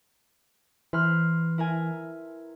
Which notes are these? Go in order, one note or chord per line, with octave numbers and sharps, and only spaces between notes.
E3 B4 C6 F6
E4 A#4 G#5